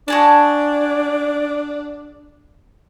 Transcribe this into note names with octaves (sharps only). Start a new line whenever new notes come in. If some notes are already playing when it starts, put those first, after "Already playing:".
D4 F#4 G#4 A5